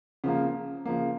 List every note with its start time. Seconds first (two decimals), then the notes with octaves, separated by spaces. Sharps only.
0.24 C#3 F3 A#3
0.85 C#3 F3 A#3